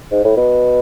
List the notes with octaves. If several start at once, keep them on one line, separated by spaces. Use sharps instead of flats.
G#2
A2
B2